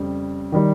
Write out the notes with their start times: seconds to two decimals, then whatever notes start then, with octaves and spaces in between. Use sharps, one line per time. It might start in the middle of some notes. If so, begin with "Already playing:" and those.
Already playing: F2 C#3 G3
0.52 D#3 G3